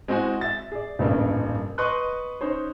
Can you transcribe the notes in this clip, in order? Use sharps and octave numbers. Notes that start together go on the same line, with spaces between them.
G#3 C4 E4 F#4 G#5
E5 A6
G#4 D5
D#1 A1 G2 A#3
B4 D#5 C6 C#6 F#6
C#4 D#4 C5 C#5